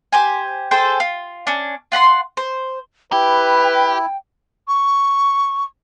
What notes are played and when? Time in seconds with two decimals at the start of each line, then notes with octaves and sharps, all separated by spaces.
0.12 G4 C5 G#5
0.71 G#4 A4 C5 G5
1.00 F4
1.47 C#4 D4
1.92 F4 F#5 B5 C6
2.37 C5
3.12 E4 G4 B4 G5
4.68 C#6